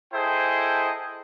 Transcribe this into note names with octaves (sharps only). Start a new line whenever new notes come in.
E4 G#4 A4 C5 D#5 G5